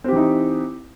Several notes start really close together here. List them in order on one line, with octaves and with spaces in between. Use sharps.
C4 G4 E3 D#4